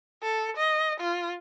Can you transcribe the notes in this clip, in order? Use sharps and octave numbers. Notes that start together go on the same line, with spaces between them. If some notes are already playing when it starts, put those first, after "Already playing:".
A4
D#5
F4